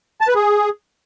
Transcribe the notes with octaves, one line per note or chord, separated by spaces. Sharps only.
A5
B4
G#4